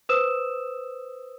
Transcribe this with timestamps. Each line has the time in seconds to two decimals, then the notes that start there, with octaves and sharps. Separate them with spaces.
0.09 B4 C5 D#6 E6 E7